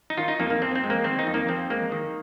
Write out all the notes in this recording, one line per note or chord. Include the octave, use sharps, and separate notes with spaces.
D#4
D#3 F4
D#4
F2 A#3
A#3
F2 C4
C4
G#3
A#3
D#3 C4
D#4
F2
A#3
F2 C4
G#3 A#3
D#3